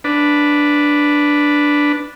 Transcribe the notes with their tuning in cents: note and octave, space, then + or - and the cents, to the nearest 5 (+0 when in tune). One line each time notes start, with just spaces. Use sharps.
D4 +0 B4 +0